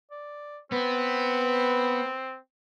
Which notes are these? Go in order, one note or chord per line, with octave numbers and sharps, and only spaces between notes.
D5
B3 C4 B4